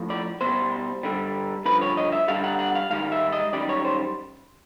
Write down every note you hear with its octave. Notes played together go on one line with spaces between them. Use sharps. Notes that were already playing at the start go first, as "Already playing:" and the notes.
Already playing: A2 F3
D5
B2 G3 C5
G2 D3 G3
G2 D3 F3 B4
C#5
D#5
E5
G2 D3 G3 F5
F#5
F#5
F5
G#2 D#3 G3 F5
E5
D#5
F#2 D#3 G3 D5
C#5
C5